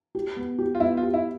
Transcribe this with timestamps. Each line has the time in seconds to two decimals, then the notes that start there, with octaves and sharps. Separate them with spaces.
0.15 G4
0.37 B3
0.59 G4
0.75 F4
0.80 B3 E4
0.97 F4
1.03 G4
1.14 E4